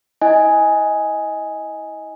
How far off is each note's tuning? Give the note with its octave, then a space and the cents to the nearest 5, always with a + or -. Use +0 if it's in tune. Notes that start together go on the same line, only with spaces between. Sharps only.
E4 -25 D#5 +15 G#5 +0